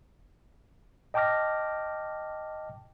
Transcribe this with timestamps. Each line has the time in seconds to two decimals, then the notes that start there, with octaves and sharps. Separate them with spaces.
1.14 D#5 G5 A5 D6 F6 A#6